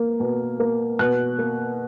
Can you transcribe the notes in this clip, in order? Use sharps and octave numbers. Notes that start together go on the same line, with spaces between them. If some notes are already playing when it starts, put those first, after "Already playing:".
Already playing: A#3
B2
A#3
B2 F#6
A#3